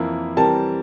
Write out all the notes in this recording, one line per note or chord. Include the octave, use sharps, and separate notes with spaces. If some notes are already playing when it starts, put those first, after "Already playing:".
Already playing: F2 E3 A#3 E4 A#4
E3 G3 C4 G4 A#4 A5